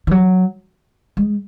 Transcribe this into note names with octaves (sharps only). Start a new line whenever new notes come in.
E3
F#3
G#3